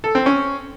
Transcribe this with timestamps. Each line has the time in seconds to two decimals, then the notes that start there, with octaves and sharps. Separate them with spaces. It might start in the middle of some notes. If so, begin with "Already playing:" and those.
0.04 A4
0.15 C4
0.26 C#4